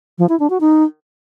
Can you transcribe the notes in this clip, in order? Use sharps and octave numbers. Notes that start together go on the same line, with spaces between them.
F3
E4
D4
F#4
D#4